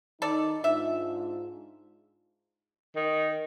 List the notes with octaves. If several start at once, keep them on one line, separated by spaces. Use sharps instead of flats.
D#3 D#4 A4 D5
G#2 D4 F4 E5
D#3